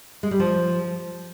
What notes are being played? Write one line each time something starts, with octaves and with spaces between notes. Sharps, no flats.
G#3
G3
F3